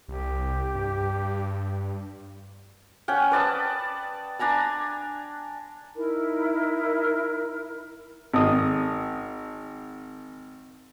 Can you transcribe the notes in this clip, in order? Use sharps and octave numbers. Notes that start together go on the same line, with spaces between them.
C2 G4
G2
C#4 F#5 G5
B4 D5 A5 D#6
D4 G#5 A#5 B5
D#4 E4 A#4
G#1 D#6